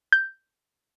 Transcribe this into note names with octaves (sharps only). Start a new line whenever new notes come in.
G6